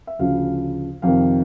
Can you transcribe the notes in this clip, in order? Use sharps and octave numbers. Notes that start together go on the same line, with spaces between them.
E5
D2 C#3 F3 F5
F2 C3 D#3 F5